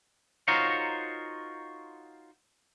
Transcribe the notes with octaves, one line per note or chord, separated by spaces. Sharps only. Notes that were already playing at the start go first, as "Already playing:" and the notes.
D#4 F4 F#4 A#4 C5 C#5